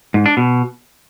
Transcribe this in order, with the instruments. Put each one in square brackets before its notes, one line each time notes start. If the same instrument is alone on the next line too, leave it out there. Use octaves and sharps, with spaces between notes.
[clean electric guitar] G#2
D4
B2